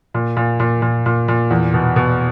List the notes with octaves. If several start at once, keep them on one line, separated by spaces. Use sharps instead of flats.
A#2
A#2
A#2
A#2
A#2
A#2
E2
B2
B2